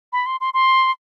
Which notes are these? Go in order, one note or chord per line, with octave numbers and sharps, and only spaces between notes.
B5
C6
C6
C6